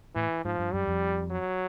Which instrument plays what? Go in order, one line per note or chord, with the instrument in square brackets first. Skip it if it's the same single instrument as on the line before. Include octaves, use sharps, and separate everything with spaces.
[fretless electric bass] A2 [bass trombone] E3
[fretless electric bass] G#2 [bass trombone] F3
[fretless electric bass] G2
[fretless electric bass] F#2 [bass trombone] G3
[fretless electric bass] F2
[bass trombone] F#3